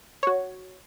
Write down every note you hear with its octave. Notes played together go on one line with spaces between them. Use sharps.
F#4 C#5